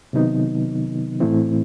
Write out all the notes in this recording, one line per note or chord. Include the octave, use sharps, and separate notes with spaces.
C3 D#3 F#3 B3 D#4
A2 E3 A3 C4 E4